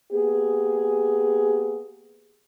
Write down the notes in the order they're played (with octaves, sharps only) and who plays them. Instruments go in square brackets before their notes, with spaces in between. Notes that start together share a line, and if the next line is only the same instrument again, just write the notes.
[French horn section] A#3 B3 G4 G#4